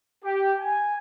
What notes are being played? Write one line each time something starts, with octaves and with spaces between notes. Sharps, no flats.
G4
G#5